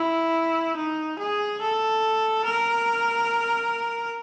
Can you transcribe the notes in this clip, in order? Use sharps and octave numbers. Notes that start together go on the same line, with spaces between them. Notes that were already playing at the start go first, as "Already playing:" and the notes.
Already playing: E4
D#4
G#4
A4
A#4